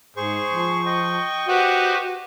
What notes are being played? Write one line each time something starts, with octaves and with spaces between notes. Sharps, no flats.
G#2 G#4 C5 C#6
F3
D#5 G5
F#4 G4 B4 C5